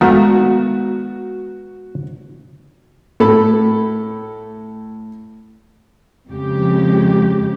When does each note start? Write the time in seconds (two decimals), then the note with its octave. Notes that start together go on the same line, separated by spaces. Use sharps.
0.01 D#3 F3 G#3 A3 B3 F#4 F#5
3.20 A2 A4 B5
6.29 F2 C#3 G#3 G4